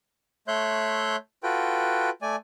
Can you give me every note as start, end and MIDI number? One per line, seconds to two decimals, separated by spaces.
0.48 1.16 57
0.48 1.16 73
0.48 1.16 76
0.48 1.16 84
0.48 1.16 90
0.48 1.16 91
1.43 2.10 65
1.43 2.10 66
1.43 2.10 69
1.43 2.10 71
1.43 2.10 79
2.22 2.36 57
2.22 2.36 74
2.22 2.36 80